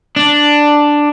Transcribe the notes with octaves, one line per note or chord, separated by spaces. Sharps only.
D4